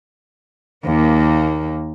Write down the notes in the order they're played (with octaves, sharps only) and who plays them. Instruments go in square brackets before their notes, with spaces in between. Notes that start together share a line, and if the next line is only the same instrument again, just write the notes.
[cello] D#2 A#3